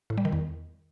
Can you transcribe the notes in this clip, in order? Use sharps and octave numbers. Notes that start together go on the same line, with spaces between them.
A2
G3
D#3
E2